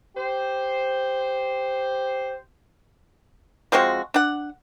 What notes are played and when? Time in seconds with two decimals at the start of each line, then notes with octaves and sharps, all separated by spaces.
0.16 G4 C5
3.72 F3 G#3 C4 F#4
4.14 D4 F#5